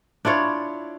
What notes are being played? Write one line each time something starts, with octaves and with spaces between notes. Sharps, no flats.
D4 E4 F4 C#5